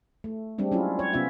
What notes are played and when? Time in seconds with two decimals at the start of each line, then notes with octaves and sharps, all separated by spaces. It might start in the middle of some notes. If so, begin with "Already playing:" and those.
0.24 A3
0.58 G3 G#3 C4 D4
0.72 F#3 C#4 E4 F4
0.99 C#5
1.13 C3 B3 C#4 F4 E5